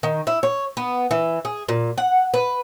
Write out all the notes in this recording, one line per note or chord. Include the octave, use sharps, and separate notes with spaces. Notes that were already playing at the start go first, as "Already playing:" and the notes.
D#3
E4
C#5
B3
E3
G#4
A#2
F#5
B4